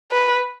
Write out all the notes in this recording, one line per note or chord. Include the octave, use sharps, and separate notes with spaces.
B4